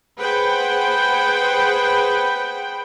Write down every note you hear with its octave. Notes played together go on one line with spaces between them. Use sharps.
G#4 B4 C5 F#5 G5